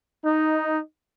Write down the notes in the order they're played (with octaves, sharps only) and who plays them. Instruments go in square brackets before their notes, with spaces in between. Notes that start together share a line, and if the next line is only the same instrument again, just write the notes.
[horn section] D#4